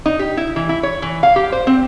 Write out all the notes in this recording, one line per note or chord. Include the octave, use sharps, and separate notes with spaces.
D#4
G4
E4
E3
E4
C#5
E3
F5
G4
C5
C4